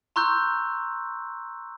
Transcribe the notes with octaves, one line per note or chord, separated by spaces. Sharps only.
A#5 C6 C#6 E6 F#6 G6